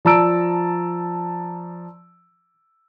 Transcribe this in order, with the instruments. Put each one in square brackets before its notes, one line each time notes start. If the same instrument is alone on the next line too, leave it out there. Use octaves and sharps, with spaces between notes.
[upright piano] F3 D5 A5 A#5 E6 D7